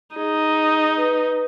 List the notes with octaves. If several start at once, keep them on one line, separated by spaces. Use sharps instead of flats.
D#4 G#4
B4